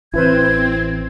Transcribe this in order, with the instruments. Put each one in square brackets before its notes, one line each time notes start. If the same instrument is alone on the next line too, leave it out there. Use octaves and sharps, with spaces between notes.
[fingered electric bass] A1 E3 [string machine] C4 [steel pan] E4 B4 C5 [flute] G#6